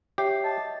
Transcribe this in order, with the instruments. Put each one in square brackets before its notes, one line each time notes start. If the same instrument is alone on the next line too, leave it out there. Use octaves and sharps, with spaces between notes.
[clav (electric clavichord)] G4 [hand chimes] C#5 E5 C7
[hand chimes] D#5 [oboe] A5